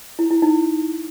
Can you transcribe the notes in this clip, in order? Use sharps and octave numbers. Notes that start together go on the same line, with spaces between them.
E4
E4
D#4